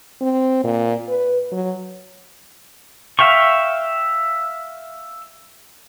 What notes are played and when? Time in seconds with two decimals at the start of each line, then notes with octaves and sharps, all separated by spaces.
0.21 C4
0.64 A#2
1.09 B4
1.52 F#3
3.19 E5 F5 G5 C#6